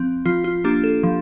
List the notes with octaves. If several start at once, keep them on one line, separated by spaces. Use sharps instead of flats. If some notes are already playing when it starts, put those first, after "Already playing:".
Already playing: F3 C4
F3 F4
F4
A#3 D4 G4
A4
F3